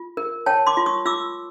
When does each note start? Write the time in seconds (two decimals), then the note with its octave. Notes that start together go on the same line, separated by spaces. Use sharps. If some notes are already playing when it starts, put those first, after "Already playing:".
Already playing: F4
0.17 A#4
0.46 C#5 G5 A5
0.67 C6 D6
0.77 F4
0.86 C#6 D#6
1.05 F4 D6 E6